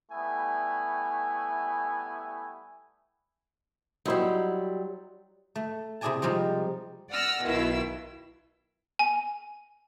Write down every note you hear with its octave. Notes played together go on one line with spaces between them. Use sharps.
G3 A3 B3 E4 G#5
F#3 G3 D#4 E4 C5
A3
C3 E4 G#4 D5 G#5 A5
C3 F3 G3 G#3 D#4
D5 F#5 E6 F6 A#6
B1 B2 D#3 E4 F4 E6
G#5